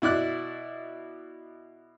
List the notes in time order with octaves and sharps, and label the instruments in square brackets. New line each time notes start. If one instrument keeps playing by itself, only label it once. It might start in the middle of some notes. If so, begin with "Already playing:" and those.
[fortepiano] B2 E4 D5 F#6